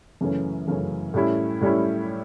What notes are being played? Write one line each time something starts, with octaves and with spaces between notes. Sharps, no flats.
F#2 C#3 E3 A3 C#4
F#2 C#3 E3 A3 C#4
A2 G3 C#4 E4
A2 G3 C#4 E4